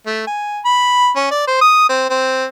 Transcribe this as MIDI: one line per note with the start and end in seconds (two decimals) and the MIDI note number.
0.06 0.24 57
0.27 0.59 80
0.65 1.10 83
1.16 1.26 61
1.31 1.42 74
1.47 1.56 72
1.61 1.87 87
1.89 2.07 60
2.10 2.45 60